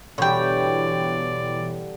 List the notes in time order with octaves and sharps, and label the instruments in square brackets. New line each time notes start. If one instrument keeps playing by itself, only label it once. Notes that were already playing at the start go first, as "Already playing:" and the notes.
[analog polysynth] B2 E3 [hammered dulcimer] D3 G3 [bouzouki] C#5 G5 [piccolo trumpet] D5